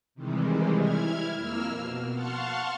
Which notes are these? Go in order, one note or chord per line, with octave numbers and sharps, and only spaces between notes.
C3 D#3 E3 G3 G#3
E4 F6 G#6
F2 A#3 E6 F6
B2
F5 F#5 A5 C6 C#6 F6